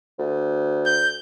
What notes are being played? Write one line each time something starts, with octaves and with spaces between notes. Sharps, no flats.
D2
G6